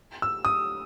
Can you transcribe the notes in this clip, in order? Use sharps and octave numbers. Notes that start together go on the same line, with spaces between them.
E6
D#6